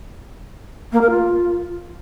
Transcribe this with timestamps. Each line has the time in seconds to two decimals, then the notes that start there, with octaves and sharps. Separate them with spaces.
0.92 A#3
1.01 A#4
1.10 F4